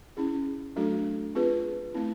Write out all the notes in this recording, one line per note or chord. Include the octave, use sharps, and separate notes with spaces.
C#4 E4 G#4
F#3 A3 D4 F#4 A4
C4 F4 G#4 B4
A3 C4 E4